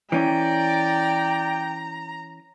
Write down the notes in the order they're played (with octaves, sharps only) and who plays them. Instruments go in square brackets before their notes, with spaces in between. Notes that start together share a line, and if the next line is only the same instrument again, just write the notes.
[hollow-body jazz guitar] E3 C#4 [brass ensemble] D5 [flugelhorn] G5 [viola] A#5